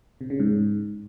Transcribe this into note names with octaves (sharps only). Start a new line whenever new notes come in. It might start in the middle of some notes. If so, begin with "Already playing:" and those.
C3
C#3
G#2